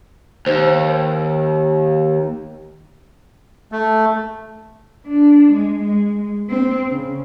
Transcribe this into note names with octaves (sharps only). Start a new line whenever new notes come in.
D#2 C5
A3
D4
G#3
G#3
C4
C#3